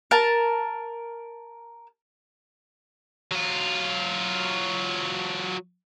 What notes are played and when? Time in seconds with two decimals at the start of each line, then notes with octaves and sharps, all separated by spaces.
0.11 A#4 A5
3.31 F#3 F4